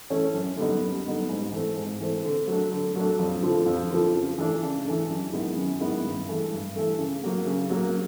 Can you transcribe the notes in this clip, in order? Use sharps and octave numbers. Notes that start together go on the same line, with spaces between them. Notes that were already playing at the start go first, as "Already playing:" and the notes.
E3 A3 C#4
F#2
D3 G3 B3 D#4
F#2
D3 G3 B3 D#4
G#2
E3 A3 C4
G#2
E3 A3 C4
D3
F#3 A3 D4
D3
F#3 A3 D4
F2
D3 F3
F2
D3 F3
C#3
E3 A3 D4
C#3
E3 A3 D4
F#2
D#3 G#3 B3 E4
F#2
D#3 G#3 B3 E4
G2
E3 A3
G2
E3 A3
C#3
F#3 A#3
C#3
F#3 A#3